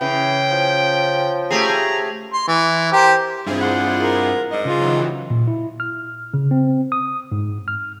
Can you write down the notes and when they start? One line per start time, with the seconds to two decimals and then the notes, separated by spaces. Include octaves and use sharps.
0.01 C#3 E3 G5
0.51 F3
1.50 A3 G4 G#4 A#5
2.33 C6
2.48 E3
2.92 G4 A#4 C5
3.46 G2 C4 E4 F4 G#4
3.62 C5 D5 F#5
4.00 A#4
4.51 G#2 D5 D#5
4.65 C#3 F4 G#4
4.80 D#3 E3 F#3
5.30 A#2
5.48 E4
5.80 F6
6.34 C#3
6.51 C4
6.92 D#6
7.32 G#2
7.68 F6